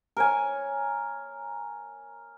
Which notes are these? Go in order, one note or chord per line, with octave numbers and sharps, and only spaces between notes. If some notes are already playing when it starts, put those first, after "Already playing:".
A#4 C#5 G#5